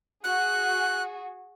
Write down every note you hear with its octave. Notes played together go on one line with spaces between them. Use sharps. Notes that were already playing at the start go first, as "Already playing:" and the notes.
F#4 G#4 F#6